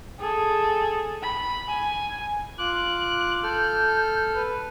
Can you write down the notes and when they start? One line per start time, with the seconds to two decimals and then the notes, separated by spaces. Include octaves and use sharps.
0.19 G#4 A4
1.23 B5
1.69 G#5
2.58 F4 D6 F#6 F#7
3.43 A4 F6 G6
4.35 B4